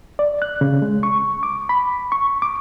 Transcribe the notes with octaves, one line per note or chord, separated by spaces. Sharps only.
D5
F#6
C#3
G#3
C#6
D6
B5
C#6
D6